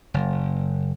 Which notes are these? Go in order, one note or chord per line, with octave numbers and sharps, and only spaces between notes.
F#1